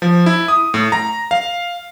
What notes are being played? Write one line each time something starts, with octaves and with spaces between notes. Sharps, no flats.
F3
E4
D#6
A2
A#5
F5